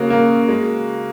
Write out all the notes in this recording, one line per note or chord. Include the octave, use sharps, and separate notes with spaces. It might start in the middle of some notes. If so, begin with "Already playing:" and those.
Already playing: C#3 A#3 F#4
A#3
G#3